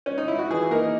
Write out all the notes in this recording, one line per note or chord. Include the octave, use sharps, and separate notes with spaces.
C#4
D#4
E4
F#4
E3 G#4
A#3 D#4 A#4